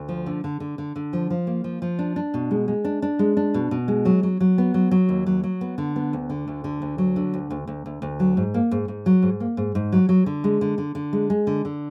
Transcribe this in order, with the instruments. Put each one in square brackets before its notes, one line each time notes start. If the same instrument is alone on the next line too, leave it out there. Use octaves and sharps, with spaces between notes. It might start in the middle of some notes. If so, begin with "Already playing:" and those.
Already playing: [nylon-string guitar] D2
F3
D3
D3
D3
D3
D3
F3
F3
A#3
F3
F3
D4
D4
B2
G#3
G#3
D4
D4
G#3
D4
B2
B2
G#3
F#3
F#3
F#3
B3
F#3
F#3
D#2
F#3
F#3
B3
D3
B3
D2
D3
D2
D3
D2
F#3
D3
D2
D2
D2
D2
D2
F#3
G#2
A#3
G#2
G#2
F#3
G#2
A#3
G#2
G#2
F#3
F#3
D3
G#3
D3
D3
D3
G#3
G#3
D3
D3